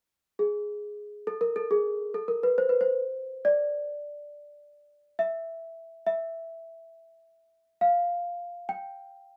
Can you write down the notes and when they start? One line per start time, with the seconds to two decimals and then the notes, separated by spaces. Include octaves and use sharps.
0.39 G#4
1.27 A4
1.41 A#4
1.56 A4
1.71 G#4
2.14 A4
2.28 A#4
2.43 B4
2.58 C5
2.69 B4
2.81 C5
3.45 D5
5.19 E5
6.07 E5
7.81 F5
8.69 G5